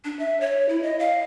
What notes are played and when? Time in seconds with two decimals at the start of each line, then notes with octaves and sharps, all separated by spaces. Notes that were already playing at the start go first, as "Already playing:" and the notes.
0.05 D4
0.19 E5
0.41 C#5
0.69 E4
0.83 D#5
0.99 F5